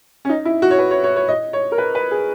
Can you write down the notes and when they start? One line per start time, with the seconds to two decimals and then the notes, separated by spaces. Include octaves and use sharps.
0.25 C#4
0.29 D#4
0.45 E4
0.62 F#4
0.71 C#5
0.79 B4
0.91 C#5
1.04 C#5
1.16 C#5
1.28 D#5
1.53 C#5
1.72 A#4
1.78 B4
1.95 B4
2.11 G#4